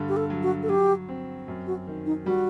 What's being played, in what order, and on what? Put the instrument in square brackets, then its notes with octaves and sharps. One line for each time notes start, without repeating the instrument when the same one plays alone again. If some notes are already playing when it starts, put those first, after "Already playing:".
Already playing: [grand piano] G2 D3
[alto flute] G4
A4
[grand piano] F#3
[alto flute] F#4
A4
[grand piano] F#3 [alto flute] G4
[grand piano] C4
F#2
[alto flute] F#4
[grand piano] D#3
[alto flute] D#4
[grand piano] G3 [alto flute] F#4